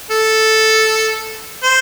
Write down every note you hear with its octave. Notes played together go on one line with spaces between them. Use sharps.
A4
C5